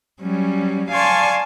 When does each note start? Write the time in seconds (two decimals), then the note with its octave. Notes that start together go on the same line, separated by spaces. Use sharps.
0.21 F#3 G3 C#4
0.91 D5 F5 G#5 A5 C6 C#6